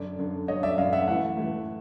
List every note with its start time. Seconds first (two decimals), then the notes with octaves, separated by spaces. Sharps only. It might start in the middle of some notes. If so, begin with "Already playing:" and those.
Already playing: F#2 D3 D5
0.19 F#2 D3
0.48 F#2 D3 C#5 D#5
0.63 D5 E5
0.78 F#2 D3 D#5 F5
0.93 E5 F#5
1.08 A2 E3 E5 F#5
1.37 A2 E3